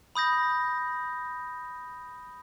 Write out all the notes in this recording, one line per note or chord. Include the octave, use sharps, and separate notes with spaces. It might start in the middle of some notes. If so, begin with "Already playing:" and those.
B5 D#6 G6 A#6